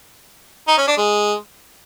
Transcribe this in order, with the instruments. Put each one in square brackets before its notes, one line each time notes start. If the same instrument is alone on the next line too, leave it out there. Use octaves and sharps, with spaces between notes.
[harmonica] D#4
C#4
D4
G#3